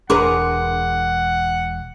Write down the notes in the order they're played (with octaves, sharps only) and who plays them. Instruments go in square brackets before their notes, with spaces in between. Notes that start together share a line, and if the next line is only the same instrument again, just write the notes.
[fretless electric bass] E1 D4 [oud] G#4 A#4 B4 [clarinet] F#5 [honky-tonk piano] C6 D6